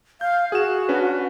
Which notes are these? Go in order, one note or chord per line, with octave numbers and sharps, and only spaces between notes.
F5 G6
F#4 G#4 E7
C#4 D4 B4